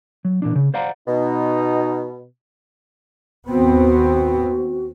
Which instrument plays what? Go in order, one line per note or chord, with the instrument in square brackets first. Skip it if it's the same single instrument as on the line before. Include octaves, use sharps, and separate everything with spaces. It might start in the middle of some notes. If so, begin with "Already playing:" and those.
[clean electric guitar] F#3
A#2 E3 D4
C#3
C5 D5 F5 F#5 A#5
[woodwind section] B2 [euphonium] D#4
[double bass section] D#2 B3 C4 [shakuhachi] F#4